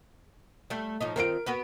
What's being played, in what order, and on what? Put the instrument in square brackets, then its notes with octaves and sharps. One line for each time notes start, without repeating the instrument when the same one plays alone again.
[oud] G3 A3
A2 F3 D#4
[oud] D#3 C4 F4 [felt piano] A#4 D7
[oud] B3 F#4 B4